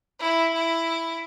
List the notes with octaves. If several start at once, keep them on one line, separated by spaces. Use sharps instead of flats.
E4
E4